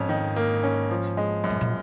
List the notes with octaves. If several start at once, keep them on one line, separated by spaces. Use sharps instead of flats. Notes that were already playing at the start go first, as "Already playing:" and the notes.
Already playing: F2 G#2 C#4
D#3
A#3
C#4
F3
G#3
F#2
G#2
A#2